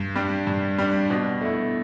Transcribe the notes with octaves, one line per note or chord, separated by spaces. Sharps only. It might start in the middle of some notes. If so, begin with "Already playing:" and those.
Already playing: G2
G3 D4
G2
G3 D4
B2
A3 E4